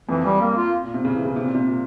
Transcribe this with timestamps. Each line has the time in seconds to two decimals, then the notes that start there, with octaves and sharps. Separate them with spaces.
0.09 F2 E3
0.25 G3
0.41 A#3
0.57 F4
0.83 A#2
0.94 C3
1.05 C#3
1.15 E3
1.25 C#3
1.36 C3
1.45 A#2
1.55 C3
1.68 A#2